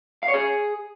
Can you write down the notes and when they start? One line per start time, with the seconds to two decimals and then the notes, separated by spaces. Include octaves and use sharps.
0.23 F5
0.28 C#5
0.34 G#4